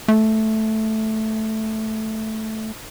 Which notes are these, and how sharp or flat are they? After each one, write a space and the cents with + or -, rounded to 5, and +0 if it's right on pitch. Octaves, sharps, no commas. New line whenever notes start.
A3 -5